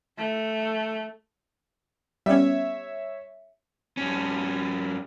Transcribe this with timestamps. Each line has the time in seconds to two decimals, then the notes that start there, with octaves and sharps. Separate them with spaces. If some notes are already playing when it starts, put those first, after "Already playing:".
0.18 A3
2.26 G3 B3 C#4 C#5 E5
3.97 G2 C#4